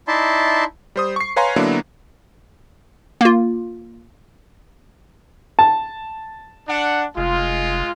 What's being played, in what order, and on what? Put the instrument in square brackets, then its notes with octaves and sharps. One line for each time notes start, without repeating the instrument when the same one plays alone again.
[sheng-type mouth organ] D#4 E4 D5 E5 A5 C6
[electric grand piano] G3 C5 D#6
C#6 C7
B4 C#5 F5 G#5 A#5 C6
D3 F#3 A#3 B3 D4 E4
[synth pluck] A#3 F4
[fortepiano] A5
[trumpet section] D4 F#5
[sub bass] F1 [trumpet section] G#3 F4